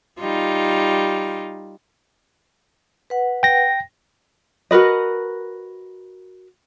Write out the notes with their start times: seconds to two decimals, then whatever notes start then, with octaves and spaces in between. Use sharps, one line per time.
0.20 G3 D#4 F4
3.10 B4 F#5
3.43 G5 A#6
4.71 F#4 A#4 B4 D#5